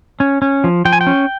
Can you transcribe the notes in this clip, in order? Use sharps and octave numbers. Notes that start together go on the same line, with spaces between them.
C#4
C#4
F3
F3 G5
G#5
G5
C#4